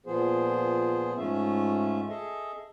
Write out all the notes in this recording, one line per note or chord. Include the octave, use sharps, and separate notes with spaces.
A#2 F3 B3 G#4 C5
G#2 A3 C#4 F4 E5
G#4 A4 D#5 E5